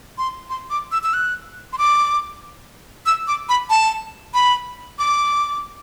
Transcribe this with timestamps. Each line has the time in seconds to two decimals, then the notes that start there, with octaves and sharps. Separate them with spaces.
0.18 C6
0.50 C6
0.70 D6
0.92 E6
1.04 E6
1.13 F#6
1.73 C6
1.78 D6
3.06 E6
3.27 D6
3.49 B5
3.70 A5
4.34 B5
4.99 D6